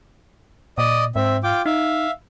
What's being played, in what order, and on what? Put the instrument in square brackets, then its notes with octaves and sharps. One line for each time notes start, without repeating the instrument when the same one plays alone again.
[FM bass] A#2 [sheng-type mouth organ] D5 D#5 D#6
[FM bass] G#2 [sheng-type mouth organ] C4 E5
[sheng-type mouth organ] F4 G5 D6
[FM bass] D#4 [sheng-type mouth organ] E5 F5